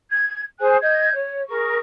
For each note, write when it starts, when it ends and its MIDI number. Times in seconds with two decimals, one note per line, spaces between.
0.11 0.42 92
0.60 0.76 68
0.60 0.76 72
0.60 0.76 80
0.60 0.76 90
0.81 1.13 75
0.81 1.13 91
0.81 1.13 92
1.13 1.41 73
1.47 1.78 68
1.47 1.78 70
1.47 1.78 85